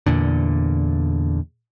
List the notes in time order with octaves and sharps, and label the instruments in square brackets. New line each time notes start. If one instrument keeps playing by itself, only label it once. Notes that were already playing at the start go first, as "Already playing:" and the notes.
[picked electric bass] E2 A#2 D3